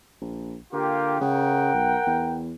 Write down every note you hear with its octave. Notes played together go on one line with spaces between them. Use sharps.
A#1
D3 A#3 F4 G4
C#3 A#4 F#5 G5
B1
E2